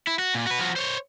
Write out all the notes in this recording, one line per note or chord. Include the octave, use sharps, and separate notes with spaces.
E4
F#4
A#2
F#4 B4
F3 F#4
C5 C#5